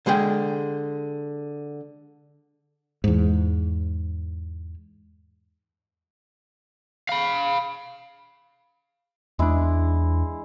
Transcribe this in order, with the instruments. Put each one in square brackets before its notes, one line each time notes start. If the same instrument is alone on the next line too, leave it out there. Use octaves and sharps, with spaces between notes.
[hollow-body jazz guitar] D3 G#3 G#4 G5
[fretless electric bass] E2 G#2
[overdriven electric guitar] F5 B5
[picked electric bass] E2 D4 [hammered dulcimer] G#3 E4